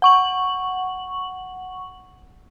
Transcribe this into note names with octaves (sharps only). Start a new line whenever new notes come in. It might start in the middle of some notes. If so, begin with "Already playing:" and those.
F#5 C#6 F#7